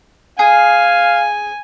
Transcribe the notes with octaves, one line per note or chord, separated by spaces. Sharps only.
G#4 F5 G#5